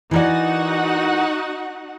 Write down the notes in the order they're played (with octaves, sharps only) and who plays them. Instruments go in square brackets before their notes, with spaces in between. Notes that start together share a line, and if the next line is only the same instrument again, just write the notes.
[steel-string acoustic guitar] E3 A#4 D5 [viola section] D#4 F#4 F#5